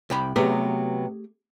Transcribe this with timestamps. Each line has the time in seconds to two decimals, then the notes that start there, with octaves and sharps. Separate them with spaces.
0.10 C2 G5 B5
0.36 C3 F#3 A3 B3 G4 G#4